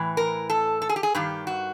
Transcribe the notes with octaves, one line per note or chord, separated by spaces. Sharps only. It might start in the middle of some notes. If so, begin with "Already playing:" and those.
Already playing: A2 E3
A#4
A4
A4
G#4
G4
G#4
G2 D#3 G4
F#4